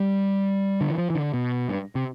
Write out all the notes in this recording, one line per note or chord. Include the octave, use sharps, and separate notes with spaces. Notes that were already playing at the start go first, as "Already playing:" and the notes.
Already playing: G3
D3
E3
F3
E3
D3
B2
G2
C3